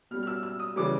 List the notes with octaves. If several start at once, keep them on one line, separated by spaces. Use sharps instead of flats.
B2 G3 F6
F6
E6
E6
D#6
C#3 E3 G3 D6